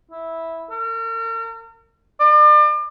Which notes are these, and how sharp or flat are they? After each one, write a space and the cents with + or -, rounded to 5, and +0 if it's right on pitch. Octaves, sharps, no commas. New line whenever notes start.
E4 -10
A#4 -40
D5 +35